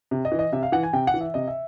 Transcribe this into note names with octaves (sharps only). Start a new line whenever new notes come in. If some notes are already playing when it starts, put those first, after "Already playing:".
C3
D#5
E3
D#5
C3 E5
F5
E3 F#5
G#5
C3 G5
F#5
E3
E5
C3 D#5
E5